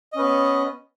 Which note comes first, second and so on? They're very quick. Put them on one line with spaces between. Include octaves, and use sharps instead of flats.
D#5 C#4 B4 B3